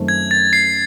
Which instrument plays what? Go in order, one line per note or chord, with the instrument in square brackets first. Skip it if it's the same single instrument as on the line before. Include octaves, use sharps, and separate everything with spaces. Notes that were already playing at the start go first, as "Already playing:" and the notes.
Already playing: [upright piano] F#2 D#3 A3 C4
[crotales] G#6
A6
C7